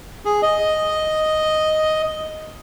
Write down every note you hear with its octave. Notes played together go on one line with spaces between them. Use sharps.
G#4
D#5